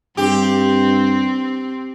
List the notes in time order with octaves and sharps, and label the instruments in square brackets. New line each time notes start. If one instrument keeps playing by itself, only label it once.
[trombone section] G2 [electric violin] C4 [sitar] G4